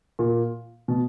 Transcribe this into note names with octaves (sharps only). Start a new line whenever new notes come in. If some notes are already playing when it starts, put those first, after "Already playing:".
A#2
B2